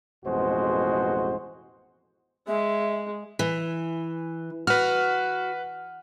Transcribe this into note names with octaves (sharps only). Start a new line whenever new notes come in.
A1 F2 B2 G#3 F#4 C5
G#3 E5
E3
F#4 B4 F6